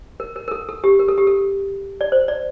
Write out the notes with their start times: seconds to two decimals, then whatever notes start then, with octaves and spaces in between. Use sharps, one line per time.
0.20 A#4
0.36 A#4
0.48 A#4
0.51 A4
0.69 A4
0.84 G4
0.99 A#4
1.08 A4
1.18 G4
1.27 A4
2.01 D5
2.12 C5
2.28 D5